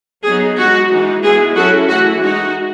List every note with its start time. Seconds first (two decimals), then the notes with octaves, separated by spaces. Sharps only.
0.24 F#3 B3 D#4 G#4
0.57 G#3 D#4 F#4
0.91 E3 G#3 D#4
1.23 G#3 B3 E4 G#4
1.56 F#3 C#4 E4 F#4 A4
1.88 E3 A3 E4 F#4
2.21 G#3 D#4 F#4